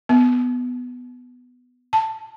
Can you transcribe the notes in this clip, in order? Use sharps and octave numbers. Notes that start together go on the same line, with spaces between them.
B3
A5